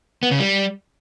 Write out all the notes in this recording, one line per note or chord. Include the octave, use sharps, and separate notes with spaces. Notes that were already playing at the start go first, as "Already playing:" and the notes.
B3
C#3
G3